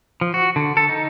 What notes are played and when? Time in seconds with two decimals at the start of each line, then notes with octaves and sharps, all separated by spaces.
0.21 F3
0.34 F#4
0.56 D3
0.77 A4
0.89 D#4